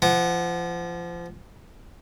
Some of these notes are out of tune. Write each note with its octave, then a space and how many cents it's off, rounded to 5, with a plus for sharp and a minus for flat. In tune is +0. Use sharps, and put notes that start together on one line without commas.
F3 -25 F#5 +0